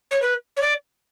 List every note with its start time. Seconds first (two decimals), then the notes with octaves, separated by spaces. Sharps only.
0.11 C#5
0.22 B4
0.57 C#5
0.62 D5